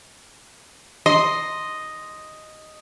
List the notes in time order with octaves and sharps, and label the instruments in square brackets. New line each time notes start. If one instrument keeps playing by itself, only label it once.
[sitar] D#5 [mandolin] C6